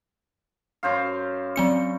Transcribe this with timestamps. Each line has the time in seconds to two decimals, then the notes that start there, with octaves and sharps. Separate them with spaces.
0.83 F#2 C5 F5
1.56 F#3 C4 C#7